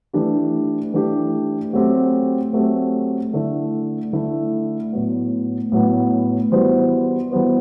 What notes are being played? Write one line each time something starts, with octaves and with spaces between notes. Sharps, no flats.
E3 A3 D4 G4
E3 A3 D4 G4
F#3 A3 C4 G4
F#3 A3 C4 G4
D3 A3 E4
D3 A3 E4
A2 F#3 B3
A2 F#3 B3
E3 G3 B3 F#4 C5
E3 G3 B3 F#4 C5